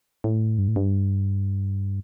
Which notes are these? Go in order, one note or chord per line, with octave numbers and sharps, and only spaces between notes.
A2
G2
A2
G2